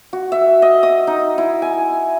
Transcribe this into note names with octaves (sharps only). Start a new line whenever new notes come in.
F#4
E5
D#5
D#6
D#4
E4
G#5